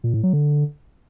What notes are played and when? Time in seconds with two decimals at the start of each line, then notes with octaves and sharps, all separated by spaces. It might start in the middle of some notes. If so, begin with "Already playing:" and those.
0.04 A#2
0.14 A2
0.23 F#3
0.33 D3